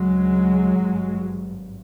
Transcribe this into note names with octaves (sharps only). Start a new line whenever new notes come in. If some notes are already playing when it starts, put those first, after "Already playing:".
Already playing: D2 C#3 F#3 G#3
G#1 G2